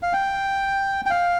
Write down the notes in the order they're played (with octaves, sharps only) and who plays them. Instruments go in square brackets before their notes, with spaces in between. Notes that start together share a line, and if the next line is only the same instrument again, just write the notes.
[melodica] F5
G5
G5
F5